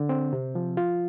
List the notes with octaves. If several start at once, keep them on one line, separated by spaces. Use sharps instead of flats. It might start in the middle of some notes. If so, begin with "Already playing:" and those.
Already playing: D3
C4
C3
F3
F4